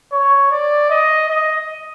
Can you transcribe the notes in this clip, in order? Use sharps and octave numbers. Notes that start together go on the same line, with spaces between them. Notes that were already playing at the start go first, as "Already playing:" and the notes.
C#5
D5
D#5
D#5